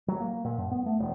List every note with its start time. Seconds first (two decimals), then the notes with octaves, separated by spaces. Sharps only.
0.08 F#3
0.20 A#3
0.44 A#2
0.58 F#2
0.71 B3
0.86 A3
1.00 E1